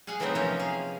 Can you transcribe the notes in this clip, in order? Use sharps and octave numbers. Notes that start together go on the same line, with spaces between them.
G#4 F5 F#5 G#5
E3 F#3 A3 B3 C4 D#4
C3 F3 A#3 C#4 C#5
G#4 F5